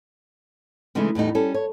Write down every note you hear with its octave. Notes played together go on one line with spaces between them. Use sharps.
C#3 E3 G#3 A3 D4 D#4
E2 A2 G3 D#4
G3 C#4 A4
C#5